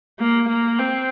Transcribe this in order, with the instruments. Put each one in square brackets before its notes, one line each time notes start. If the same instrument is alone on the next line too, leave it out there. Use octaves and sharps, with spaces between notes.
[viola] A#3
A#3
C4